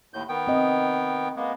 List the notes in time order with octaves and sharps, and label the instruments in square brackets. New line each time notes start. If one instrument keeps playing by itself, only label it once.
[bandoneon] D#2 A2 G6
D#3 B3 G5
[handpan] C4 D#5
[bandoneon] G#3 A#3 B3